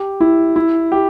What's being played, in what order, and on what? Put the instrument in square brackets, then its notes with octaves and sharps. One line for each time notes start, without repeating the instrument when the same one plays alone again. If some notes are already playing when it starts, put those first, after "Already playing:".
Already playing: [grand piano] G4
E4
E4
G4